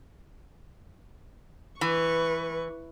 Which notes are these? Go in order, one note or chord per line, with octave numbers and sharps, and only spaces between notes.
E3 B4 C#6